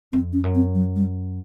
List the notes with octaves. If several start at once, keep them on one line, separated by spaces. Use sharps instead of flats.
F2 C4
C#4
F#2
C4
F#3
G3